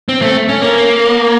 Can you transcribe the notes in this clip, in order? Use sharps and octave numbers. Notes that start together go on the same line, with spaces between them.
C4
A3
C#4
A#3